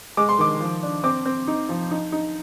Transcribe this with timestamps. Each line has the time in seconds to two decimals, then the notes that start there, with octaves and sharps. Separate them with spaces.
0.17 G#3 D6
0.29 C6
0.38 D#3 D6
0.60 F3
0.83 D4
1.04 C4 D6
1.25 C4
1.48 D#4
1.69 F3
1.91 D#4
2.12 D#4